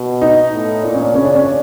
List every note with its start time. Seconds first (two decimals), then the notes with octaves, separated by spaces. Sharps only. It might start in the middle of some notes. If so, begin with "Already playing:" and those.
Already playing: B2
0.22 D#4
0.53 A2
0.83 A#2 D4
0.94 C#4
1.05 D4
1.15 C#3 C#4
1.25 D4
1.35 C#4
1.45 D4